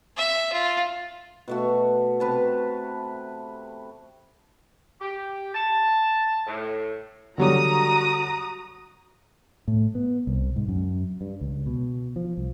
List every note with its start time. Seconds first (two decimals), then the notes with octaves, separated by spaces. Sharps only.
0.17 E5
0.52 F4
1.48 B2 A3 F#4
2.20 C3 B4 A5
5.01 G4
5.55 A5
6.47 A2
7.38 D3 F#3 G3 F#4 A#5 D#6
9.68 A2
9.95 B3
10.27 C2
10.56 G#2
10.68 F#2
11.21 G2
11.41 C#2
11.66 B2
12.16 F3
12.37 C2